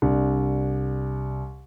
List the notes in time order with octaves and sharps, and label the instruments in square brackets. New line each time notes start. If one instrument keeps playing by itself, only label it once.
[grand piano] C2 D4